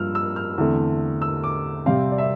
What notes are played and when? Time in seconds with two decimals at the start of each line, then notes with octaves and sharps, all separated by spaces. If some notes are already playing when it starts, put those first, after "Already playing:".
Already playing: G2 F3 A#3 E6 F6
0.15 E6
0.36 F6
0.58 E2 D3 A3 C4
1.22 E6
1.44 D6
1.86 C3 G3 C4 F5
2.12 D5
2.18 E5